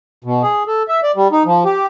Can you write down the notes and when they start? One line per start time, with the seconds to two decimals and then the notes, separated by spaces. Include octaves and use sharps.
0.24 B2
0.43 G#4
0.67 A4
0.89 E5
1.03 D5
1.16 G3
1.32 D#4
1.45 F3
1.65 G4